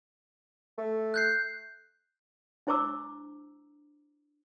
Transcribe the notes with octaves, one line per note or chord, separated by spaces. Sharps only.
A3
F#6 G6 C7
D4 E4 C5 A#5 D6 E6